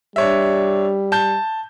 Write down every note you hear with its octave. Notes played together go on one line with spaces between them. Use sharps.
G3 D4 C#5 E5
A5 G6